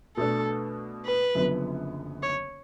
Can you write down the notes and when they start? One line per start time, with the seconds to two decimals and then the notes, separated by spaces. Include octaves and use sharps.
0.17 B2 A3 D4 A4
1.05 B4
1.35 F#1 F#2 D3 F3 B3
2.23 C#5